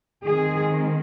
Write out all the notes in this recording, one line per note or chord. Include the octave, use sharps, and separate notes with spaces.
D#3 G#3 C4 G#4